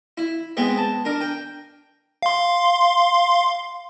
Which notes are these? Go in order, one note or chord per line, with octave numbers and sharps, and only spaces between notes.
E4
G#3 B3 C4
A5
D4 A#4
G5
F5 C6